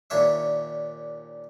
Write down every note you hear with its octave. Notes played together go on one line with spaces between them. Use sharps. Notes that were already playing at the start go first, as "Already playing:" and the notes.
D#2 A#2 D4 C#5 E5